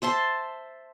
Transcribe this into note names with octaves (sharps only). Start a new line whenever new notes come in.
C5 E5 A5 C6